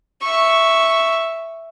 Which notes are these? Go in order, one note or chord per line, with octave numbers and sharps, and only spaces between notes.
E5 C#6